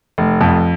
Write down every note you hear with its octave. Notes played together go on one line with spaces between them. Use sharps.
F1
F2